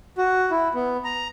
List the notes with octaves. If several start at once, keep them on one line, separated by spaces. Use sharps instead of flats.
F#4
E4
B3
A#5